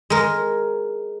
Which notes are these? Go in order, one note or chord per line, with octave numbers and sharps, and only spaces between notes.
G#3 A#4